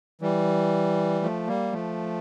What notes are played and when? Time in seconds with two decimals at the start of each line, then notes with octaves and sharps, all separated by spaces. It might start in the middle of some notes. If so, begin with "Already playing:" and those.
0.21 E3 G3
1.22 F3 A3
1.47 G3 A#3
1.72 F3 A3